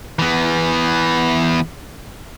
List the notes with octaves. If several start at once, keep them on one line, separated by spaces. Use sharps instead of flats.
E3 B3